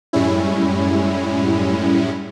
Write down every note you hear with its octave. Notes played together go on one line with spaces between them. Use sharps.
F#2 A2 G3 G#3 C#4 E4